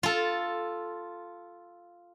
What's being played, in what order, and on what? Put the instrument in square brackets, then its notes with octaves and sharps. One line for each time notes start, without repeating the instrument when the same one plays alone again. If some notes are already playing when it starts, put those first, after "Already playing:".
[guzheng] F4 A4